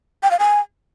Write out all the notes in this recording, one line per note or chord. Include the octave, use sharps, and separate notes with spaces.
G5
F5
G#5